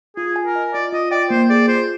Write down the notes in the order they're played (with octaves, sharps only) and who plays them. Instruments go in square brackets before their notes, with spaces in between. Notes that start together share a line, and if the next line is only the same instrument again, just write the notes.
[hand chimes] F4 [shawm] G#4
[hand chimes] G#5
[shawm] A#4
[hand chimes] D#5
[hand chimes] F4 [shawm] D5
[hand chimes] F4 [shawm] D#5
[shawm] D5 [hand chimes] G5
[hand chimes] A#3 [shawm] C5
[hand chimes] G#4 [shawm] D5
[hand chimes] F4 [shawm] C5